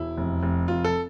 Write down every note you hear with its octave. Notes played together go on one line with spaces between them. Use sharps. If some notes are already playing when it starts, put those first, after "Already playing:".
Already playing: E1 E4
F1
F1
F1 F4
A4